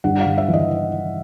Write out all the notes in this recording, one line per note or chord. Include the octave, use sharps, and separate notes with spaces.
G2 F#5
F5
G2
E5
E3
D#5